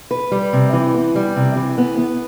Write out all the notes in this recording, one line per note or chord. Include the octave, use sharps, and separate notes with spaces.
B4
G3
C3
E3
B3
G3
C3
E3
B3
B3